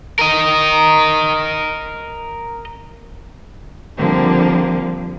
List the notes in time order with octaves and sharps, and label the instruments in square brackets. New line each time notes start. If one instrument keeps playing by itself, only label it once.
[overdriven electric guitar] A#4 D#5
[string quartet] D3 F3 G3 A#3 C4